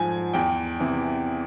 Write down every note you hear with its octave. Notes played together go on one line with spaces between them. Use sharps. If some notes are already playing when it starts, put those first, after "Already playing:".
Already playing: G#2 F3 G#5
E2 G5
C3 E3